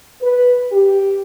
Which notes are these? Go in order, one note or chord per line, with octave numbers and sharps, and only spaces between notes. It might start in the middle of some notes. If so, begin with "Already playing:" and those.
B4
G4